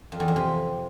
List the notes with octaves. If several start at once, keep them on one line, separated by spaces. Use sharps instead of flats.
F2
E2
F2
C3